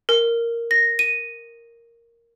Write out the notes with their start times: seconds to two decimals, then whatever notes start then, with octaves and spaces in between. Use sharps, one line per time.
0.09 A#4
0.71 A#6
0.99 D#7